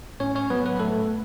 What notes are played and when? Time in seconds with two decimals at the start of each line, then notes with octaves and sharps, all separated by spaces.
0.20 A2 C#4 C#5
0.35 C#4 C#5
0.50 F#3 B3 B4
0.65 B3 B4
0.80 A2 A3 A4